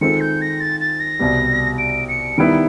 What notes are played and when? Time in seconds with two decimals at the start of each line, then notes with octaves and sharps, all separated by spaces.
0.01 D#3 G#3 C4 F4 A4 C#7
0.20 G6
0.41 A#6
0.60 A6
0.80 A6
1.00 A#6
1.19 C2 B2 G3 B3
1.78 D7
2.08 C#7
2.38 D#3 G3 B3 E4 D7